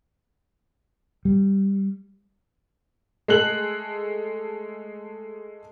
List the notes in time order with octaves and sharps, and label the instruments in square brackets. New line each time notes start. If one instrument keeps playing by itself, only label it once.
[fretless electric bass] G3
[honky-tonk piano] G#3 A3 A4 F#6 F#7